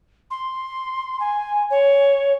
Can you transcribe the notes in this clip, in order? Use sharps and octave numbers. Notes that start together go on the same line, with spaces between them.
C6
G#5
C#5